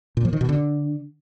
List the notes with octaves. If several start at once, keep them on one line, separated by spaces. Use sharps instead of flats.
A#2
F3
D#3
B2
D3